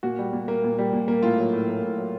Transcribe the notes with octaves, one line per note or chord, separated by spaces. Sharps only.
A#2 F#4
G3
A#2
A#3
A#2
G3
A#2
A#3
A2 F4
F#3
A2
A#3
A2
F#3